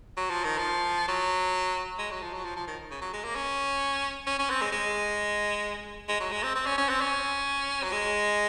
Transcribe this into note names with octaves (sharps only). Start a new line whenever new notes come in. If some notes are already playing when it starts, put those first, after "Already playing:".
F#3
F3
D#3
F3
F#3
G#3
F#3
F3
F#3
F3
F3
D#3
C#3
F#3
G#3
A#3
C#4
C#4
C#4
C4
G#3
G#3
G#3
F#3
G#3
C4
C4
C#4
C#4
C4
C#4
F#3
G#3